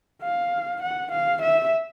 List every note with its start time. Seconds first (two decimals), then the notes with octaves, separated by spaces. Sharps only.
0.23 F5
0.82 F#5
1.12 F5
1.42 E5